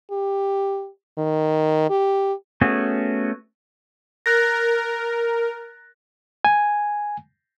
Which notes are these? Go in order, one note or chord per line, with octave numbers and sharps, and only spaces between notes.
G4
D#3
G4
A3 B3 C#4 F#4 G#4
A#4 F#6 A6 A#6
G#5